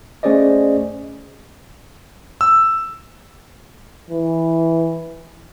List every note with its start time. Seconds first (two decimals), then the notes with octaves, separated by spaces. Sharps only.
0.23 A3 C#4 G#4 C5 D5 D#5
2.41 E6
4.10 E3